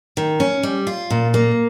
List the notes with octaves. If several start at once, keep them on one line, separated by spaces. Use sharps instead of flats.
D#3
C#4
G3
F4
A#2
A#3